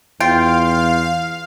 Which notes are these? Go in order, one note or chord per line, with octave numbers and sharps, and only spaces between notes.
E2 F4 F5 G5